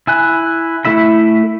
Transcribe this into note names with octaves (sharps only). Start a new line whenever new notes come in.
E4 G#5 F#6
A3 E4 E5 B5